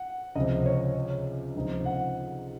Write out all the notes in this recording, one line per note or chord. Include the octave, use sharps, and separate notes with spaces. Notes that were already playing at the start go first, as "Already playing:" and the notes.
Already playing: F#5
C#2 C3 F3 D#5
C#5
C#2 C3 F3 C4 D#4
F#5